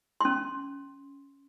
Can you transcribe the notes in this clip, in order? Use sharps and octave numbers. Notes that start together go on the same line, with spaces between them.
C#4 C6